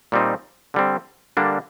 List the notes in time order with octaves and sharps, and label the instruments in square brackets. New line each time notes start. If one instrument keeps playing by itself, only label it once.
[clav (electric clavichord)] A#2 G3 C4 D#4
D3 G3 C4
D3 G3 A#3 D4